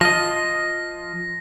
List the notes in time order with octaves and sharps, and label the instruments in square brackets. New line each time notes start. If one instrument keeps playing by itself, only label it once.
[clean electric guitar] F3 F4 D#5 [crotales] A#6